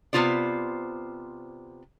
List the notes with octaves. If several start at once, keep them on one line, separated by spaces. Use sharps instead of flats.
C3 G#3 B3 F4 C5 D5